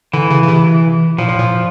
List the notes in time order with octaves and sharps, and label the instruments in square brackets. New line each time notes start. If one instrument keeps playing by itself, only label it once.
[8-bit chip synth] D3 [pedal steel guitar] E3
[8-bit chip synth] C#3
C#3
C3
[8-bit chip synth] A#2 [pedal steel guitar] F3
[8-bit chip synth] A2
A#2